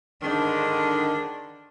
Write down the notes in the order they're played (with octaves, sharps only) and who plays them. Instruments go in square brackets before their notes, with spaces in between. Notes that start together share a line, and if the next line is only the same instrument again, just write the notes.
[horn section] G#2 D3 D#3 [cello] D4